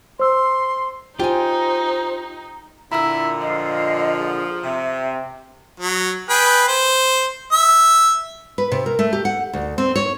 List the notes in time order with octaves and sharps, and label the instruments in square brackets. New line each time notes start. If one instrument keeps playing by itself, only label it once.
[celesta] C5 E6 [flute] C6
[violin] D#4 [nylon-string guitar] F4 G#5 [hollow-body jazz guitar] G4 [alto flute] C5
[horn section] A#2 D3 [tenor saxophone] E4 [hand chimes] A#5 E6
[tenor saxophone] F3 [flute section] D#5 F5
[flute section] G#4
[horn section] C3 [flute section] E5
[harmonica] F#3
G#4 B4 G5
C5
E5
[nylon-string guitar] B4
C3
A#4
A3
G4
F#5
D2
C4
C#5